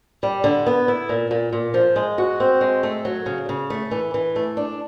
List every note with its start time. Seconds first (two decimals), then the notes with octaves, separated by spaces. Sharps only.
0.23 G3
0.44 D3
0.66 B3
0.88 E4
1.09 A#2
1.31 A#2
1.53 A#2
1.74 F3
1.96 G#3
2.18 F#4
2.40 C4
2.61 G#3
2.83 A3
3.05 F#3
3.26 C#3
3.49 C#3
3.70 A3
3.91 E3
4.14 E3
4.36 A3
4.57 D4